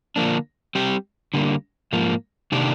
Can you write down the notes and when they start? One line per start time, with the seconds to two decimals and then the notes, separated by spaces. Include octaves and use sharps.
0.16 D3 F3 A#3 D4
0.75 G3 C4 G4
1.34 D3 G3 A#3
1.93 G#2 F3 A#3
2.52 C3 D#3 A#3 D4 G4